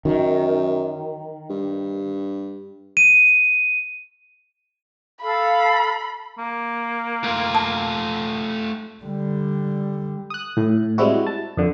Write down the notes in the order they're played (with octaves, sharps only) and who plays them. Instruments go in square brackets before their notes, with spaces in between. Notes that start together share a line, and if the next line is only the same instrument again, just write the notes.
[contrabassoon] F#2 [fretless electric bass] D#3
[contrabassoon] G2
[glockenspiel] D#7
[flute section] A4 F5 [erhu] B5
[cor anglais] A#3
[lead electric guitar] A3 F4
[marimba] A5
[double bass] D3 G3
[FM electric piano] D#6 F#6
A2
G3 G#3 C4 E4 F#4
A5
F2 D3